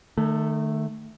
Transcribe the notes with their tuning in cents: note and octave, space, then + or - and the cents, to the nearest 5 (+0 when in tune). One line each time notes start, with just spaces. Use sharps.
D#3 -35 A3 +0